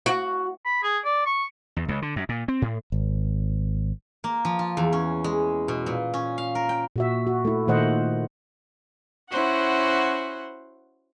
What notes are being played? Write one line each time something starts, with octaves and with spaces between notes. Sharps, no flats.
F#4
B5
G#4
D5
C#6
E2
C#2
D3
F#2
A#2
C4
A2
G#1
A#3
F3
F4
E2
C#4
G#3
B2
A#2
C#4
F5
A#4
G5
A#2 F#4 E5
F#4
A3 E4
A#2 D#3 A3 C5 D#5 F#5
C#4 E4 F#4 C5 F#5